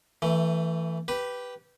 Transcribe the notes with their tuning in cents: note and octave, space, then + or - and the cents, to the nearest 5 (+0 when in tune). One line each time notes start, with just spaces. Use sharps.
E3 +0 A3 +25
G4 -10 B4 +0